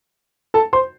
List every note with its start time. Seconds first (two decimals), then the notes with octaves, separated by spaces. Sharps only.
0.54 A4 A5
0.73 C5 C6